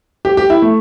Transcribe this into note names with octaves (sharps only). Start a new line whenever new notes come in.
G4
G4
E4
A3